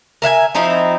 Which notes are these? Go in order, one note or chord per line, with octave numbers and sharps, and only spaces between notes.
A#4 E5 F5 G#5
F3 C4 D#4 E4